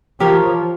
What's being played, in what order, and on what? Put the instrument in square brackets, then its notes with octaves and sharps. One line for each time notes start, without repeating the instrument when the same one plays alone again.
[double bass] F3 [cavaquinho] G4 A#4 C#5